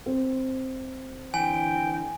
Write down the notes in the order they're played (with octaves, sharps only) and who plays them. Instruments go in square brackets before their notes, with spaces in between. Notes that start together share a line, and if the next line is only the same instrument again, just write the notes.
[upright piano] C4
[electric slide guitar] D3 E3 [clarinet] G5 [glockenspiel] G#5